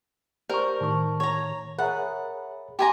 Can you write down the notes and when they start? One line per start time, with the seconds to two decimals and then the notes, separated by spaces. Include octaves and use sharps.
0.50 G4 A#4 C5 D5 C#6
0.81 A2 D#3 A5 C#6
1.20 C#5 A#5
1.78 G#4 A#4 C#5 E5 F#5 A#5 B5
2.79 G4 G5 G#5 A#5 C6 D6